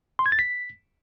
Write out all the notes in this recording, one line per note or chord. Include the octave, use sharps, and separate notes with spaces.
C6
G#6
A6
B6